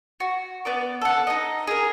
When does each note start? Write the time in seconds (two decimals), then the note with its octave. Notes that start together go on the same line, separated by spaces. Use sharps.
0.20 F#4
0.65 B3 D5 D6
1.01 A4 F#5
1.27 D#4 D#5
1.67 G#4 A#4